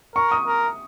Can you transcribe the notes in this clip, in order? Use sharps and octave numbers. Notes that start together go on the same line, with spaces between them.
A#4 C#6
D#6
A#4